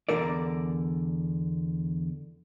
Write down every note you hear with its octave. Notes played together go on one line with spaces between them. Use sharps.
E2 D3 E3 A4 A#4 D5